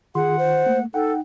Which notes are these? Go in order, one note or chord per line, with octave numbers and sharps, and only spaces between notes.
D#3 F4 G#4 F#5 C6
C5
A3 A#3
D#4 A4 F#5 G5